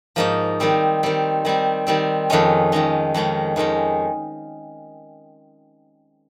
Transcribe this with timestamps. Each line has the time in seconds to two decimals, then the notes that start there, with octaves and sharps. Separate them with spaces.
0.16 G#2 F3 A#3 D#4
0.60 D#3 G3 C4
1.03 D#3 G3 C4
1.45 D#3 G3 C4
1.87 D#3 G3 C4
2.30 F2 D#3 G#3 C#4
2.72 F2 D#3 G#3 C#4
3.14 F2 D#3 G#3 C#4
3.56 F2 D#3 G#3 C#4